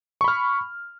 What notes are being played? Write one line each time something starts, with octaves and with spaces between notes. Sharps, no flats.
B5 C#6 F6